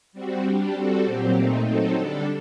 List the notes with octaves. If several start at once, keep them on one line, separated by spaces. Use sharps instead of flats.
G3 C4 F#4
G3 D4 G4
G3 C4 F#4 A4
A#2 F#3 C4 G4
A#2 A3 C4 D#4
F#3 C4 D#4 A4
D3 G3 D4 A4